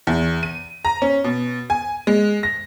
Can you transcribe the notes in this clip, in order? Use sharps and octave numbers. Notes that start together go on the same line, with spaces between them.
E2
D#7
A#5
C#4
B2
G#5
G#3
A#6